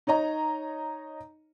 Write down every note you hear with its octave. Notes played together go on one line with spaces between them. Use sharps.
D#4 C#5 D#5 A#5